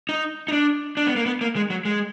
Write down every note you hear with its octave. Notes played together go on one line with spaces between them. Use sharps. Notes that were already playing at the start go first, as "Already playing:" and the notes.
D#4
D#4
D4
D4
B3
A#3
B3
A#3
G#3
F#3
G#3